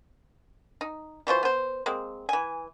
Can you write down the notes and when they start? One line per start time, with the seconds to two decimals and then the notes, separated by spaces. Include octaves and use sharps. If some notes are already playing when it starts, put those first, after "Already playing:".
0.81 D#4
1.27 E3 F#3 F4 C5
1.43 B3 C5
1.86 G#3 A#3 C4
2.29 E3 G#5